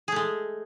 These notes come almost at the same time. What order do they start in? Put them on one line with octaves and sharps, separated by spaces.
G#4 A3 G#3